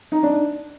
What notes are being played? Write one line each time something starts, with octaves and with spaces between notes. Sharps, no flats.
D#4
D4